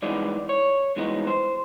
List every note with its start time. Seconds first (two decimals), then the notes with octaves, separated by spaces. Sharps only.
0.02 G2 E3 G#3 B3 D#4 D5
0.49 C#5
0.96 G2 E3 G#3 B3 D#4
1.27 C5